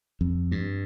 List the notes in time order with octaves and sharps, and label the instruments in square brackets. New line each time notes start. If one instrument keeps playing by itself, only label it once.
[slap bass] F2
G2